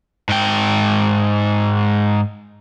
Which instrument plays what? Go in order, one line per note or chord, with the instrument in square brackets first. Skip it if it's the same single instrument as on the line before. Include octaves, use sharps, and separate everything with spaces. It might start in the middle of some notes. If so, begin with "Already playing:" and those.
[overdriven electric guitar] G#2 G5